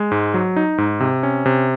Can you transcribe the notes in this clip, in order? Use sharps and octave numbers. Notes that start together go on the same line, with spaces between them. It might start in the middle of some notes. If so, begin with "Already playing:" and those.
Already playing: G#3
G#2
F#3
D#4
G#2
C3
C#4
C3